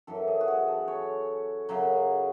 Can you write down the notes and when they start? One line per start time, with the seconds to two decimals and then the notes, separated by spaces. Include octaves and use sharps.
0.07 F#2 E3 A4
0.28 G#4
0.41 F#4
0.48 G#4
0.68 A4
0.88 C#5
1.69 F#2 C#3 F#3